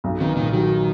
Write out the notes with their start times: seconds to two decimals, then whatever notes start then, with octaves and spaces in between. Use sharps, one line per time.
0.04 B1
0.21 D#3 B3
0.36 A#2 D#3
0.53 D#3 F#3